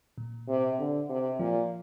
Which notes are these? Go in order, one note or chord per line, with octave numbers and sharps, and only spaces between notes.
A#2
C3
D3
C3
A#2 F3